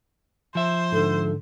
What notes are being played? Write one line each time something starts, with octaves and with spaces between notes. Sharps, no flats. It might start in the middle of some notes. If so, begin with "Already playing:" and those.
F3 C5 E5
G#2 D3 A4